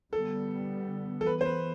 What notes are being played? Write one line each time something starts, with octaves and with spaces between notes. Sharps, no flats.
D3 G3 B3 A4
A4
E3 B3 B4
C5
B4